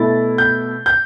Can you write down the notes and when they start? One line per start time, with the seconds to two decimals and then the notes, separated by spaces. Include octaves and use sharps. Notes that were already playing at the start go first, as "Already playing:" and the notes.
Already playing: B2 A3 E4 A6
0.38 G6
0.86 G6